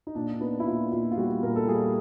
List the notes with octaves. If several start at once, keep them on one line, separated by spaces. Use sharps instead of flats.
D#4
A#2 D4
D4
B3 D#4
E4
A#2 F4
A#2 F4
F4
G3 F#4
A#2 A#4
A4
G3 G#4